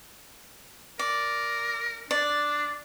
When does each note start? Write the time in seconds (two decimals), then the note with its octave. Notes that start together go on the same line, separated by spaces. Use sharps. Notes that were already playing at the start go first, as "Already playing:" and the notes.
0.99 A#4 D5
2.11 D4 D5